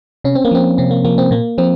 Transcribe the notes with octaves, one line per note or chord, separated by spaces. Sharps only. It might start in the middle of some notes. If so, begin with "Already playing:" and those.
C3 C#4
C4
A#3
F3 C4
C3 C4
A#3
F3 A#3
C4
A#2 A#3
F3 C4